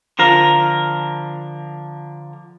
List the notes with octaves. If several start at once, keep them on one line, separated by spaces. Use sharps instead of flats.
D3 F3 A#4